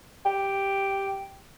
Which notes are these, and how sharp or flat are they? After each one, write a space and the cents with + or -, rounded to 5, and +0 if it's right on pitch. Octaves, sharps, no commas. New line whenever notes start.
G4 +0